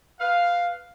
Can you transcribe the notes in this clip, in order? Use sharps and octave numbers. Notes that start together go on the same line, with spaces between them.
B4 F5